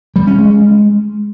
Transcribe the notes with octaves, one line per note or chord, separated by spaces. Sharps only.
G3
C#4
G#3